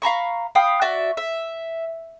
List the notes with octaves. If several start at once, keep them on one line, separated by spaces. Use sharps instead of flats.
F5 A#5 B5 C#6
F5 G5 B5 D#6
F#4 D5 E5
E5